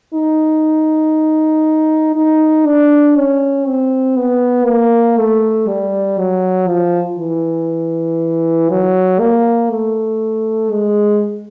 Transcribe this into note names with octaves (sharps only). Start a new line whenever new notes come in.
D#4
D#4
D4
C#4
C4
B3
A#3
A3
G3
F#3
F3
E3
F#3
A#3
A3
G#3